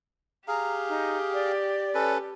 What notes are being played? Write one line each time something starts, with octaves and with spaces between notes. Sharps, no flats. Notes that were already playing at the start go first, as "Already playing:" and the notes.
G4 G#4 F5 A#5
D#4
D5
C#4 A4 B4